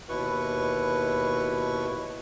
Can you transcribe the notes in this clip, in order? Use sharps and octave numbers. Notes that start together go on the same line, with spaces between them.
D#2 B2 E4 B4 C#6